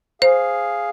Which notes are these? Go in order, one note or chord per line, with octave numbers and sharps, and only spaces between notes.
G#4 C5 F5